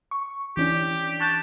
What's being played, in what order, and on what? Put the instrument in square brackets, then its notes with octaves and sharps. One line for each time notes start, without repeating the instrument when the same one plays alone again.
[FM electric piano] C#6
[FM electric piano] E3 C#4 D4 [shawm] G4
[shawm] A5 [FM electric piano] C#6 F#6 G6